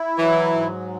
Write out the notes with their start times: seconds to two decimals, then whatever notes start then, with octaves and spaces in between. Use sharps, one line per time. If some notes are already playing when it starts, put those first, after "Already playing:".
Already playing: E4
0.18 E3 F#3
0.54 G#2